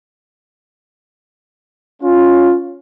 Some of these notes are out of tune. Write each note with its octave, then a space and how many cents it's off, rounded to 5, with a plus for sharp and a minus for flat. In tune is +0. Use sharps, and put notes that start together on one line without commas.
C#4 +0 F4 +10